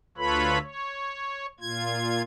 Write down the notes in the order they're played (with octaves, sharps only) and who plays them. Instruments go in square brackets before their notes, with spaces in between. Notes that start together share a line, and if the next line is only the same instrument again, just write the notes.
[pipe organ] D2 F4 A4 B4 C#5 B5
C#5
A#2 F4 G#6